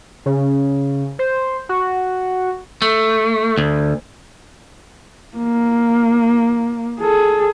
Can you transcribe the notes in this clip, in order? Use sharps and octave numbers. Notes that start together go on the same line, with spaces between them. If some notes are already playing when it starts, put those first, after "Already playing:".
C#3
C5
F#4
A3
D2
A#3
G#4 A4